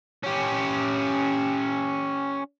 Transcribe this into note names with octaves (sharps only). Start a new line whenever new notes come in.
C#4 G4